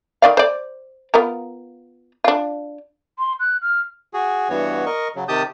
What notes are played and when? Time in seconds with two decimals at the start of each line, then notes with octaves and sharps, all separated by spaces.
0.22 D#3 D5 F5
0.37 C5 D5
1.14 B3 F4 A#4
2.24 D4 F4
3.19 C6
3.40 F#6
3.62 F6
4.14 F#4 G#4
4.50 G2 E3 B3 F#4 C#5
4.86 A#4 D#5 C#6
5.16 C#3 F#3
5.28 C3 D#3 G4 A5 D#6 G6